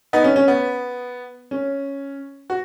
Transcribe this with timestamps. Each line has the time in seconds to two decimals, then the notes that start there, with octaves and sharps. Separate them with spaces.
0.13 B3 D#4
0.24 C#4
0.36 C#4
0.48 B3
1.51 C#4
2.50 F#4